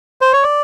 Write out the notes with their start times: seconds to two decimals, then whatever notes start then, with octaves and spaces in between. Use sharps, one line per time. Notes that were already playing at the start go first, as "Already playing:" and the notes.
0.21 C5
0.33 C#5
0.43 D5